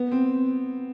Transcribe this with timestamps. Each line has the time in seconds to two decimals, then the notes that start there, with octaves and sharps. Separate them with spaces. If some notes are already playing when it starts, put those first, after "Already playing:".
Already playing: B3
0.12 C4